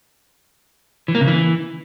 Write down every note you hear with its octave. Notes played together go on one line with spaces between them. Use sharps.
E3
A#3
C#3
E3